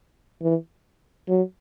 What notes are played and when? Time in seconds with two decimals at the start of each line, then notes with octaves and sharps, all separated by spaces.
0.42 E3
1.28 F#3